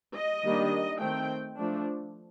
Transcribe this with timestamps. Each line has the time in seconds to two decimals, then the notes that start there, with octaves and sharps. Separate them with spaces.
0.15 D#5
0.43 D#3 G3 A#3 D4
1.00 D#3 A3 C4 G5
1.57 F3 A3 D4